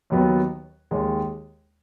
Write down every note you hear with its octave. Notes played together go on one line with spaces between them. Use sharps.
D#2 D#3 F#3 B3
D#2 D#3 G#3